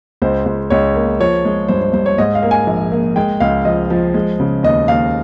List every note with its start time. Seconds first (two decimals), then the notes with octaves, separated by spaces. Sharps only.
0.22 C#2 C5
0.46 C#2
0.70 C#2 C#5
0.95 A#3
1.20 F3 C#5
1.45 G#3
1.68 G2 C5
1.81 C5
1.93 G2 C5
2.06 C#5
2.18 G#2 D#5
2.35 F5
2.43 A#3
2.51 G#5
2.67 A#1
2.92 A#3
3.16 G#3 G5
3.40 C#2 F5
3.65 F3 D#5
3.90 F3
4.14 G#3
4.40 C#3
4.63 D#2 D#5
4.88 D#2 F5